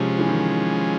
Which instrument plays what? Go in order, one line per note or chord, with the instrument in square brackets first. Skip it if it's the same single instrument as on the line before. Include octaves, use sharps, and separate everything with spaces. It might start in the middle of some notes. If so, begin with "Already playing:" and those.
Already playing: [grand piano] C3 [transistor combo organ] F3 G#3 C#4
[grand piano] E3
D#3